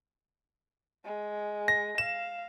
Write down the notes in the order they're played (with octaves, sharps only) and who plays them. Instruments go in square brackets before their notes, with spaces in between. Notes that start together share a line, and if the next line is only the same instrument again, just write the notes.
[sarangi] G#3
[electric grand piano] A#6
[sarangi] F5 [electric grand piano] E7